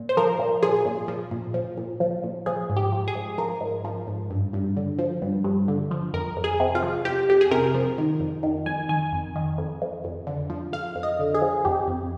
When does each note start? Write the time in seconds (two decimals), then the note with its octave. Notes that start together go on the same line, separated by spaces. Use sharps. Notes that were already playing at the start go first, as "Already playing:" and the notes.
Already playing: A#2
0.09 C5
0.17 F3 A#4
0.39 A#2
0.63 F3 G#4
0.85 A#2
1.08 F3
1.31 A#2
1.54 F3
1.78 A#2
2.00 F3
2.24 A#2
2.46 F3 G#4
2.70 G#2
2.76 G4
2.92 F3
3.08 G#4
3.15 G#2
3.38 F3 A#4
3.61 G#2
3.84 F3
4.07 G#2
4.30 G2
4.53 G2
4.77 D3
4.99 F3
5.22 G2
5.44 G2
5.68 D3
5.91 F3
6.14 F2 A#4
6.36 F2
6.44 G#4
6.60 C3
6.75 F4
6.83 F3
7.05 F2 G4
7.29 F2 G4
7.41 G#4
7.51 C3 A#4
7.75 F3
7.98 D#3
8.20 F2
8.43 D#3
8.66 F2 G#5
8.89 D#3 G#5
9.13 F2
9.36 D#3
9.58 F2
9.82 F2
10.04 F2
10.27 D3
10.50 F3
10.72 F2 F5
10.96 F2
11.03 D#5
11.19 D3
11.34 G#4
11.41 F3
11.65 F2 G4
11.88 F2